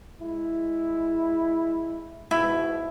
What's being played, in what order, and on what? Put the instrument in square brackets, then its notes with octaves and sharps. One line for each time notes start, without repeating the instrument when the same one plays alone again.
[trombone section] G#3 E4
[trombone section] G#2 B2 [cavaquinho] E4